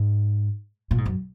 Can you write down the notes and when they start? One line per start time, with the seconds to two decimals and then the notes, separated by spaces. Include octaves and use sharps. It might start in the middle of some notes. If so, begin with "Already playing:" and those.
Already playing: G#2
0.91 A#2
0.98 G#2
1.06 F#2